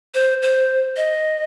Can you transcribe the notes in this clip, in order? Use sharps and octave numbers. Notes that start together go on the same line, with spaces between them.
C5
C5
D#5